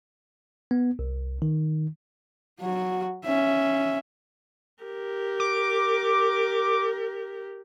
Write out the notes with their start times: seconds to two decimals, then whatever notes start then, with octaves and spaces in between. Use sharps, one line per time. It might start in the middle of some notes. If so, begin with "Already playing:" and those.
0.71 B3
0.99 C2
1.42 D#3
2.60 F#3 F#4
3.25 C#4 E5
4.83 G4 A#4
5.40 D6